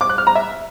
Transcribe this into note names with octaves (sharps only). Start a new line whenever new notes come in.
D6
F#6
F6
A#5
E5